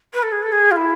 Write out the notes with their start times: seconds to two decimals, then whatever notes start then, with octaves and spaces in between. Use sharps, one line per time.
0.13 B4
0.22 A4
0.32 G#4
0.42 A4
0.52 G#4
0.71 F4
0.76 E4